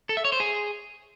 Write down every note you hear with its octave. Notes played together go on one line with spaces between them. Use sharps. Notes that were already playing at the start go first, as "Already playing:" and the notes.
A4
E5
C#5
C5
G#4